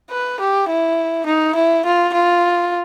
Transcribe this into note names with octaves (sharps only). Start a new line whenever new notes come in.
B4
G4
E4
D#4
E4
F4
F4